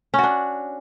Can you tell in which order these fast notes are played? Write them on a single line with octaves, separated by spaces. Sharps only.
C#4 F#4 D4